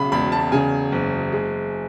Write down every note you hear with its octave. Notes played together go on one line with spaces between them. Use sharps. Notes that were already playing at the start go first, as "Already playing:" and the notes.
Already playing: B1 C#3 B5
E1 B5
A5
C#3 G#5
F#1
G#3